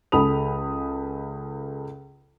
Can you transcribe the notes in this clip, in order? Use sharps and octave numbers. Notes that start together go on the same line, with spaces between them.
C#2 G#3 A4 B5 D#6 F7